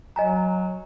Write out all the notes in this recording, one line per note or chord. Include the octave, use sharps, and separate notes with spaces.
F#3 D#5 G#5 A#5